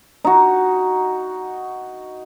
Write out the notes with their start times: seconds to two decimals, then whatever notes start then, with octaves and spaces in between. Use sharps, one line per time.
0.24 D#4 F#4